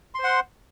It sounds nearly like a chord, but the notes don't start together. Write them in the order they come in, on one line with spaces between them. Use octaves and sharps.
C6 C5 F#5